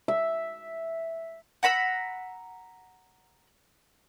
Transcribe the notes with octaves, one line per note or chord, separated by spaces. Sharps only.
E5
F#5 A#5 B5 E6